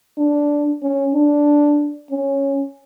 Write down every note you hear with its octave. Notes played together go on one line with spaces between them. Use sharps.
D4
C#4
D4
C#4